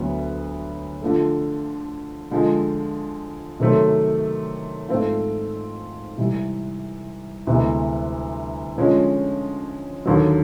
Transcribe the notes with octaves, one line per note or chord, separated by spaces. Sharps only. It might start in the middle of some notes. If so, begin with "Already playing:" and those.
Already playing: D2 D3 F#3 B3
D3 F3 A3
D3 F3 G#3
C3 D#3 F#3 A3 C4
G#2 F3 A3 C4 F4
C3 E3 G3
D2 C3 E3 G#3 B3
D3 F3 G#3 C#4
D#2 D3 F#3